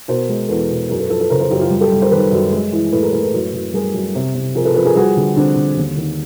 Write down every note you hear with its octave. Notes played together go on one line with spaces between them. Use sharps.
B2 A#4 C5
G#3
E2 A4 B4
B2
F#2 G#4 A#4
A4 B4
F3 A4 B4
A4 B4
C#3 A#4 C5
A#4 C5
F#2 F4 G4
F4 G4
G3
G4 A4
G3
A#4 C5
D#3 A4 B4
F#2
G#3
E3
A2 A4 B4
G#4 A#4
A2 A4 B4
A4 B4
F#2
F#2
G3 G#4 A#4
F#2
C3
C3
F3 G#4 A#4
A4 B4
F3 A4 B4
G#4 A#4
G3 F#4 G#4
D3
D3 C4 D4
D3
D#2
D#3